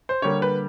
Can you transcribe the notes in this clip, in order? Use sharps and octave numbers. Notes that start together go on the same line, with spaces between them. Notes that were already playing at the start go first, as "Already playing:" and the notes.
C5
D3 G3 A#3 C#5
B4